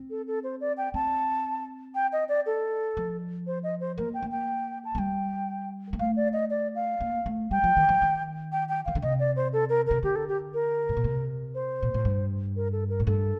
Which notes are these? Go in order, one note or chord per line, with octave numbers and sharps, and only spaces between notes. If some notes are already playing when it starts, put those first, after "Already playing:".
Already playing: C4
A4
A4
C5
D5
G5
C4 A5
G5
D#5
D5
A4
F3
C5
D#5
C5
A#3 A#4
G5
A#3
G5
A5
A3
G3 G5
A#3
A3 F5
D5
D#5
D5
F5
A#3
A3
G3 G5
F3
D#3
F3
D#3
G5
G5
D#3 F5
D3
C3 D#5
D5
C5
A4
A#4
C3 A#4
D3 G4
A4
G4
A#4
A2
A#2
C3
C5
A#2
A2
G2
A#4
A4
A#4
A2
G2 A4